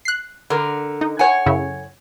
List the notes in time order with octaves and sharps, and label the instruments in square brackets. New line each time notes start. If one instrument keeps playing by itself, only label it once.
[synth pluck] F#6 C7
[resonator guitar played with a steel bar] D3 A#4
[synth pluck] D#4
[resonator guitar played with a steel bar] C#5 F#5 G#5
[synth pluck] F#2 C#3 E4